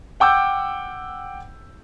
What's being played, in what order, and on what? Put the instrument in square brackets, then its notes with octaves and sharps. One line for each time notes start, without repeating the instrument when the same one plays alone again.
[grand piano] F#5 G5 D6 E6 G6